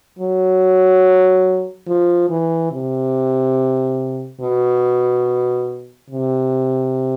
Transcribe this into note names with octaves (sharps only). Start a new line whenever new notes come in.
F#3
F3
E3
C3
B2
C3